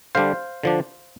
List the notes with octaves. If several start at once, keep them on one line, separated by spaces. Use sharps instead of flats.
D3 G3 D4 C5 F5
D3 F3 D4